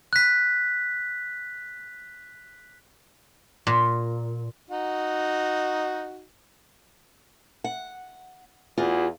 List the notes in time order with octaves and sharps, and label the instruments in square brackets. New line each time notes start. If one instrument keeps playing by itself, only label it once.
[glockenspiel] F#6 B6
[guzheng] A#2
[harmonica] D#4 F#4
[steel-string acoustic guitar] F#5
[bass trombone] E2 [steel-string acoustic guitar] F4 F#4 G#4